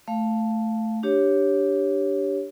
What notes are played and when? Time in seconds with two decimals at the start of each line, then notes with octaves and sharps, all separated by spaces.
0.08 A3 F5
1.03 D4 G4 C#5